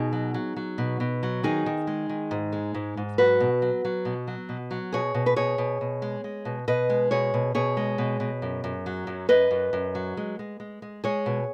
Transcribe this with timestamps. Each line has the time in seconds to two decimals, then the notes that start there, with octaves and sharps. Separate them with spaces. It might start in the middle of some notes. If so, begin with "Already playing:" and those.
Already playing: B2 D#4 G#4
0.13 F#3
0.34 F#3
0.56 F#3
0.78 B2
1.00 B2
1.23 F#3
1.43 D#3 D#4 G#4
1.66 D#3
1.87 G#3
2.09 D#3
2.31 G#2
2.53 G#3
2.74 G#2
2.97 G#2
3.18 F#3 F#4 B4
3.40 B2
3.62 F#3
3.85 F#3
4.05 B2
4.27 F#3
4.49 B2
4.71 F#3
4.92 B2 G#4 C#5
5.14 B2
5.26 B4
5.36 B2 G#4 C#5
5.58 B2
5.81 B2
6.02 G#3
6.24 G#3
6.45 B2
6.68 B2 B4 D#5
6.90 G#3
7.11 B2 G#4 C#5
7.34 B2
7.55 B2 G#4 C#5
7.77 G#3
7.98 B2
8.20 B2
8.42 F#2
8.64 F#2
8.86 F#3
9.07 F#2
9.29 F#2 B4 D#5
9.51 F#2
9.73 F#2
9.95 F#3
10.17 G#3
10.39 G#3
10.60 G#3
10.82 G#3
11.04 G#3 G#4 C#5
11.26 B2